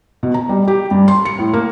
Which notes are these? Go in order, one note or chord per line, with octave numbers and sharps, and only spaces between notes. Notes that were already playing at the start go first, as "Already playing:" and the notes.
B2
A#5
G3
G4
G2
C6
C#7
A2
A#3